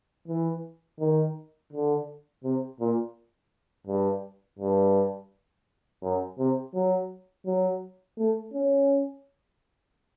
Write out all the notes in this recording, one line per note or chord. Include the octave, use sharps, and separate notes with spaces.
E3
D#3
D3
C3
A#2
G2
G2
F#2
C3
F#3
F#3
A3
C#4